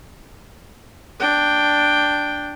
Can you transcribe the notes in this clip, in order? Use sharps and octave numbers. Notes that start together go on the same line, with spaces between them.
D4 G5